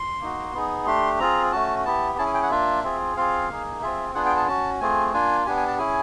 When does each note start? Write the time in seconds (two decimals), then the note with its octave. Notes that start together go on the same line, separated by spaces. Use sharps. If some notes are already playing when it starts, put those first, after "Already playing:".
Already playing: C6
0.21 A#3 D#4 F#4
0.54 B3 D#4 G#4
0.86 A3 D4 G4 C6
1.19 C4 F4 G#4 A#5
1.52 A3 C#4 F#4 A5
1.85 B3 E4 G4 A5
2.18 C#4 E4 G#4 A5
2.26 G#5
2.34 G5
2.43 F#5
2.51 A#3 D4 F4 E5
2.83 C4 F4 G#4
3.16 C4 F4 G#4 F5
3.49 A#3 D#4 G#4
3.82 C4 F4 G#4 E5
4.15 B3 D4 F4 G#4 F#5
4.26 G5
4.36 A5
4.48 C#4 F#4 A5
4.81 A3 C4 F4 G#4 G#5
5.13 A#3 D4 F4 G#5
5.46 B3 D4 G4 G#5
5.57 G#5
5.68 A5
5.79 C#4 E4 G#4 G#5